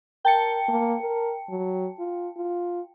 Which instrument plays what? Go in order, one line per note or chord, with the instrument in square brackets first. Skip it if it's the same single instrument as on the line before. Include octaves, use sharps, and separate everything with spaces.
[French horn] A#4 [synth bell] G5 A5 C#7
[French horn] A#3
A#4
F#3
F4
F4